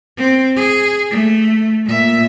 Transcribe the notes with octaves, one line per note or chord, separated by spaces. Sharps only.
C4
G#4
A3
A#2 E5